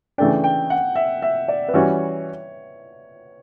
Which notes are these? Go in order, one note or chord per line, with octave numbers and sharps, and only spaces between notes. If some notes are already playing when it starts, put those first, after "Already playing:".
C#3 E3 A3 D4 G5
G5
F#5
E5
E5
D5
B4
E3 G3 C#4 F#4 C#5